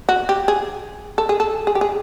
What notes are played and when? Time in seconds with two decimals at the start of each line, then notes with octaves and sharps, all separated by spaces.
0.09 F#4
0.29 G4
0.48 G#4
1.18 A4
1.29 G#4
1.40 A4
1.67 G#4
1.75 G4
1.81 G#4